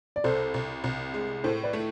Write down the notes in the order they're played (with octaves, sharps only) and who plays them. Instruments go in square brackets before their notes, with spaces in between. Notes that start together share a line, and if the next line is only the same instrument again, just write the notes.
[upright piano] D5
[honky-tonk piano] C2 [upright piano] A4 C5
[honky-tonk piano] C2
C2
G#3
[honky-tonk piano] A2 [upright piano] A4 C5
[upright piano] B4 D5
[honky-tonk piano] A3